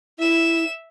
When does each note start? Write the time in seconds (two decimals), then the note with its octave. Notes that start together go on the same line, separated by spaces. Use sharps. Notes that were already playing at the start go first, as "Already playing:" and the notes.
0.19 E4 E5 E7